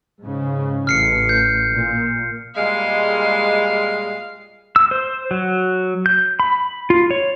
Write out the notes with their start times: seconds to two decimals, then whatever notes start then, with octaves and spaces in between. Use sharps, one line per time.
0.22 G#2 C#3
0.87 A1 F6 C7 C#7
1.29 G6
1.72 A#2
2.55 A#2 G3 G#3 F5
4.76 E6
4.91 C5
5.31 F#3
6.06 G6
6.40 B5
6.90 F4
7.11 C#5